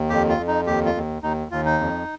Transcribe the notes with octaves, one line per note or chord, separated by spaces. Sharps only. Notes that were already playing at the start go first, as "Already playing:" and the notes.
Already playing: D#2
F2 G4
F4
F2
D#4
D#2 G4
F4
D#2
D#2 D#4
D#2 F4
D#4
F2